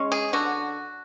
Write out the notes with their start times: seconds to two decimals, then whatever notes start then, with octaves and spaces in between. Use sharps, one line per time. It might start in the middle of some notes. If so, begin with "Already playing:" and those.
Already playing: G#3 C#4
0.12 G#4
0.33 D3 F#4